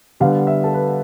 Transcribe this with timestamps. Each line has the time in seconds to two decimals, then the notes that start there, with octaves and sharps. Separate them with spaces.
0.20 D3 G3 B3 F5
0.47 E5
0.64 A4
0.74 B4